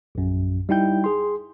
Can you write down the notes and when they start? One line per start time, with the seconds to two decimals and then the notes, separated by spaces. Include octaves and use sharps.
0.15 A#1 F#2
0.69 G3 D#4 E4 G5 G6
1.04 G#4 C6